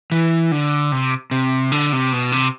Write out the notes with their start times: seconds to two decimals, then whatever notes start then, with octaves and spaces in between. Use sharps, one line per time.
0.12 E3
0.52 D3
0.92 C3
1.31 C3
1.72 D3
1.92 C3
2.13 B2
2.32 C3